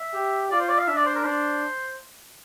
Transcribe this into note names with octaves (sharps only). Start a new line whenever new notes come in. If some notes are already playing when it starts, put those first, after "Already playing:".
Already playing: E5
G4
F4 D5
C5
D5
F5
D4 E5
D5
C5
A#4
D4 C5